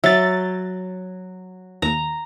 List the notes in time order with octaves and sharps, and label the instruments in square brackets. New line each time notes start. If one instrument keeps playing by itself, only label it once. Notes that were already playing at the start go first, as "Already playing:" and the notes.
[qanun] F#3 [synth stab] E5 A6
[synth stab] D#2 [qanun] A#5